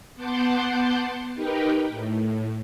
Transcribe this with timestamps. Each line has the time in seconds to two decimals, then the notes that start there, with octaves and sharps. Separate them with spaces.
0.16 B3 F#5 A5 C6 D6 G6
1.35 D#4 G4 A#4 B4 G5
1.88 A2